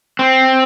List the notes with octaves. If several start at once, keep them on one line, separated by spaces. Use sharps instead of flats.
C4